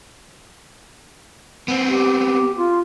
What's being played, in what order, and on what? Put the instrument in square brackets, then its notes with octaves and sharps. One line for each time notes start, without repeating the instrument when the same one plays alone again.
[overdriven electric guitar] B3 C4
[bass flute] G4
F4